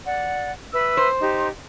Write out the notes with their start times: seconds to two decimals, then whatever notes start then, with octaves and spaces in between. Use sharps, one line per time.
0.05 D5 F#5
0.73 B4 E5 E6
0.97 C5
1.20 D#4 G4